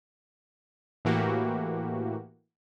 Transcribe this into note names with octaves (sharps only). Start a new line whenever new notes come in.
A2 E3 A#3 F#4 G4